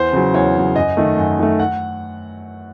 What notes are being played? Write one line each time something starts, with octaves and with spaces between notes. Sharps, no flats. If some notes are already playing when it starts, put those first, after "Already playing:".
Already playing: E2 C5
C#3 F#3
E2 C#5
C#3 F#3
F#2 D#5
D#3 A3
F#2
D#3 A3
F#5